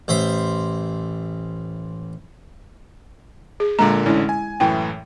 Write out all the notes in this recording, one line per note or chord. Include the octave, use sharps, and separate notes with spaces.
A1 C5 E5 C6
G#4
A#2 D3 G#3 A#3 A#5
A1 D3 G#3 C#4 E4
G#5
F#2 A2 E3 G5